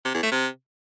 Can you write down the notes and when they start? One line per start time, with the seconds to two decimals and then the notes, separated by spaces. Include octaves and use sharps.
0.05 C3
0.14 E2
0.23 A3
0.32 C3